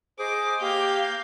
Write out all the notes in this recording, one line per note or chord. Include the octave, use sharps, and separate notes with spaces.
G#4 C5 D#5 D6
A#3 G4 F5 G6